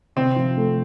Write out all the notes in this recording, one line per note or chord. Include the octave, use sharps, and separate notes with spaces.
C3 C4
F3
A3